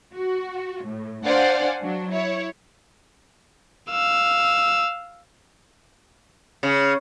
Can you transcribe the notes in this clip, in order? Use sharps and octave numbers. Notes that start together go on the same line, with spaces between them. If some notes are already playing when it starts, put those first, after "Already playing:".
F#4
A2
D4 C5 D5 F5 F#5 G#5
F#3 D4
E4 C#5
F5 E6
C#3